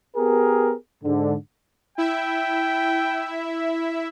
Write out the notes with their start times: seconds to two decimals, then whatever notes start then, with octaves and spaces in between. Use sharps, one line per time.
0.17 B3 G4 G#4 A#4
1.04 G#2 D3
1.98 E4 E5 G5